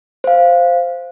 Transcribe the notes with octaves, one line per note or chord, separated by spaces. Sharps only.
C5 F5